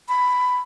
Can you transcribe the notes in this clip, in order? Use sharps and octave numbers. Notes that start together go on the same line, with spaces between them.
B5